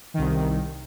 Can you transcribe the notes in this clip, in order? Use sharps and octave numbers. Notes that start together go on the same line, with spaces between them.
C2 D#3